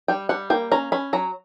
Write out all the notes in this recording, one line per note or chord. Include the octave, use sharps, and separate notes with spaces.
G3 G5
G3 F#5
A#3 G5
C#4 A#5
C#4 B5
F#3 A#5